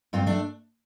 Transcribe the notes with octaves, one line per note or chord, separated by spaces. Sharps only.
G2 C4 F4
A3 D4